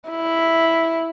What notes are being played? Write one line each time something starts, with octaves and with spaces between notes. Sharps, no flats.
E4